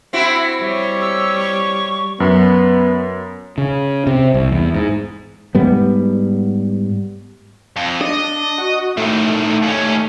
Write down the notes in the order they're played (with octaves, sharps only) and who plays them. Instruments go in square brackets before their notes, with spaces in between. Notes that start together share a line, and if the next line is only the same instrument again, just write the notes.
[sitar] C4 E4 F#4
[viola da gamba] G3 C#5
[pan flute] E6
C#6
[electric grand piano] F#2 [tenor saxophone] B3
[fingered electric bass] C#3
C3
C2
E2
G#2
[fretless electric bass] G#2 G3 B3
[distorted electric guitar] F2
[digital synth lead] D4 [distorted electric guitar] D#5
[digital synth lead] F#4
[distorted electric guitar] A2 D#3 [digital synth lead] A3
[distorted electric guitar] D#2 C#4